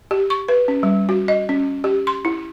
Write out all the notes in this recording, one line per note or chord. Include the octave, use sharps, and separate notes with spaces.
G4
C#6
B4
C#4
G3
F#4
D#5
C#4
G4
C6
E4